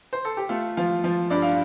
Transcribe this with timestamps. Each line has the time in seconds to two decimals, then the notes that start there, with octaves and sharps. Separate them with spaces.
0.13 C5
0.25 A4
0.37 G4
0.49 A3 F4
0.77 F3 F4
1.04 F3 F4
1.30 G2 D5
1.42 F5